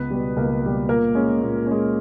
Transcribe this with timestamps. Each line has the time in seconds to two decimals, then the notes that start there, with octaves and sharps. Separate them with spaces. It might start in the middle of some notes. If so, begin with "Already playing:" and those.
Already playing: C#2 B3 B4
0.10 B2 G3
0.36 C#2 A#3 A#4
0.62 B2 G3
0.89 A#2 A#3 A#4
1.15 G#3 C#4
1.41 A#2
1.66 G#3 C#4